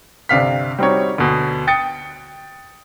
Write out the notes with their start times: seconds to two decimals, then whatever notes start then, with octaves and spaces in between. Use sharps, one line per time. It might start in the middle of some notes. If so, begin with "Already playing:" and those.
0.29 G1 C3 D4 F5 F6 B6
0.79 G3 C4 D#4 F#4 C#5
1.18 D2 B2
1.67 G5 D#6 A6 C#7